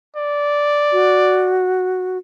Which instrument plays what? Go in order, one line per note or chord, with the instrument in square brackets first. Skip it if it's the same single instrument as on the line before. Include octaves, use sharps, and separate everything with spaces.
[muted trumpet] D5
[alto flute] F#4